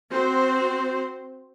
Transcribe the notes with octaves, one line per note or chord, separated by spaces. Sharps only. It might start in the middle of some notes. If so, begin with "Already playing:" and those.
C4 F#4 C5